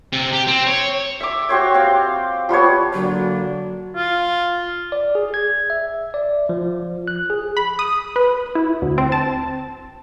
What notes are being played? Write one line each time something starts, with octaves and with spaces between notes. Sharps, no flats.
C3
G4
C4
C#5
E5 D6
F#4 G4 C5 C#5
C4 F5
F3 G3 B3 C#5
D3 F#3 A#3 D4 F#4
F4
D5
G#4
G#6
E5
D5
F3
F#6
G#4
B5
D#6
B4
E4
D2
C4
A5